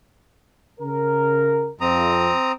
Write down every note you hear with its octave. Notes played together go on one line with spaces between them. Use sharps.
C#3 A#4
F2 C4 A#5 D#6